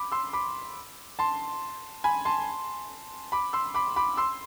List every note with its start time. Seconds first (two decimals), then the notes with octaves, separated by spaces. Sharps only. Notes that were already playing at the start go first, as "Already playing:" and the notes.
Already playing: B5 D6
0.12 C6 E6
0.33 B5 D6
1.19 A5 C6
2.04 G#5 B5
2.25 A5 C6
3.32 B5 D6
3.53 C6 E6
3.74 B5 D6
3.96 B5 D6
4.17 C6 E6